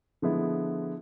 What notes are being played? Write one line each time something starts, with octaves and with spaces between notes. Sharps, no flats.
D3 F3 G#3 B3 E4